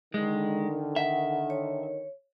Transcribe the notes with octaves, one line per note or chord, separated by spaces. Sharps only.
D3 D#3 G#3
E5 F#5
C#5